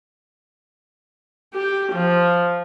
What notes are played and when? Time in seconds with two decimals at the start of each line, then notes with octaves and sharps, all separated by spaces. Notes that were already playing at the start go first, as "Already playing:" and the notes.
1.54 G4
1.92 F3